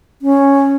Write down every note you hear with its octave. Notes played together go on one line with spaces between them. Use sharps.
C#4